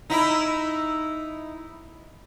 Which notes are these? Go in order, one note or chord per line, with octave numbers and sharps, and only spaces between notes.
D#4 E4